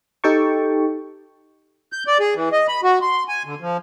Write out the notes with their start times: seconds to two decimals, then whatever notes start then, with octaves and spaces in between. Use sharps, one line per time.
0.24 D#4 G4 A4 G5 A5 C#6
1.93 G6
2.07 D5
2.20 G#4
2.35 E3
2.52 D#5
2.68 B5
2.83 F#4
3.02 C6
3.28 G#5
3.45 D3
3.61 F3